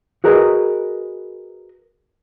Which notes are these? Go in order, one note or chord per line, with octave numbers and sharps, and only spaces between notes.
F#4 G#4 A#4 B4 D#5